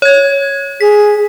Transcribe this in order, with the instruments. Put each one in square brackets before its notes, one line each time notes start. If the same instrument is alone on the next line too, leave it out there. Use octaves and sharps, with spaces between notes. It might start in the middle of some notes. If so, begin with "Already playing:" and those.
[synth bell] C#5 G#6
[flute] G#4 [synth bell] B6